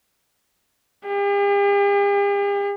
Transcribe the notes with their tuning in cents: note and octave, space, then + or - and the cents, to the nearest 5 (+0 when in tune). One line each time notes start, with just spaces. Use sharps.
G4 +45